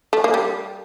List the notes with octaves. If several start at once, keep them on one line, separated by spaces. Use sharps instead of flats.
A3
A#3
G3